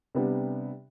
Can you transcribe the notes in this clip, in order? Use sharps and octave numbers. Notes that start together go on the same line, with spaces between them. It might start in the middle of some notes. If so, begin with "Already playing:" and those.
C3 G3 B3 D4